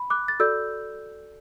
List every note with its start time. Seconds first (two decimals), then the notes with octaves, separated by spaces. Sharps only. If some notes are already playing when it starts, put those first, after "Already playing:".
Already playing: B5
0.10 D6 F#6
0.28 A6
0.40 F#4 A4 D5 E6 G6